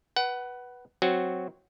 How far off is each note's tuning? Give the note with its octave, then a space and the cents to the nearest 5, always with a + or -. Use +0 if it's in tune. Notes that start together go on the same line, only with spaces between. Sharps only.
B4 -10 F#5 +20
F#3 +0 C4 +0 F#4 +0